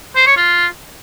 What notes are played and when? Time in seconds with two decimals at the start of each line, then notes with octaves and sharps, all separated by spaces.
0.16 C5
0.26 C#5
0.37 F4